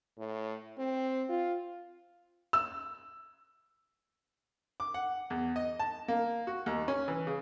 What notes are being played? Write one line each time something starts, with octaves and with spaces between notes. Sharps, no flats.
A2
C4
F4
E6
D6
F#5
E2
D#5
A5
A#3
F#4
D#2
C#4
E3
C#3